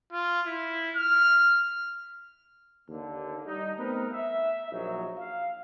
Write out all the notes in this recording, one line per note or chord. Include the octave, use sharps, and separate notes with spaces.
F4
E4
F6
D#2 D3 A#3
G3 D#4
A3 B3 C4 D#4 A#4 B4
E5
A#1 F#3 D#4
F5